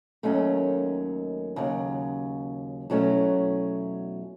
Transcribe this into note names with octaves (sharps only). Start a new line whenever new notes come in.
D#2 D#3 F#3 A3 C#4
D#2 C#3 F#3
E2 B2 F#3 A3 C#4